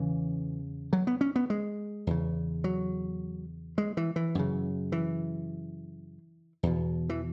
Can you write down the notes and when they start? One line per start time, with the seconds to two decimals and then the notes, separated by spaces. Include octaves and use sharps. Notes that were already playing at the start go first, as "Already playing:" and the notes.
Already playing: E2 C#3 E3
0.93 F#3
1.07 B3
1.21 C#4
1.36 B3
1.50 G#3
2.07 E2 C#3
2.64 F#3
3.78 G#3
3.97 E3
4.16 E3
4.35 F#2 C#3
4.92 E3
6.63 E2 B2
7.09 E3